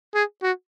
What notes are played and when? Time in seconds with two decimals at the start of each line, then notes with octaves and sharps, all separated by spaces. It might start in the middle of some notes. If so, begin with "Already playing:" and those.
0.15 G#4
0.43 F#4